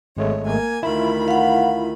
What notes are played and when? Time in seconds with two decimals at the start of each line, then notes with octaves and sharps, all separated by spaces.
0.17 G#1 G#3 A3 C#5
0.45 A#3 G#5
0.83 D2 D#3 E4 F4 B5
1.28 F5 F#5